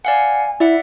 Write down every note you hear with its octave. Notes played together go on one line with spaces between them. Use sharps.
D5 F5 F#5 G#5
E4 D5 E5 F#5